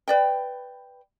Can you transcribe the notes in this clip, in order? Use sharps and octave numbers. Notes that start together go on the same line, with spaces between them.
B4 D5 G5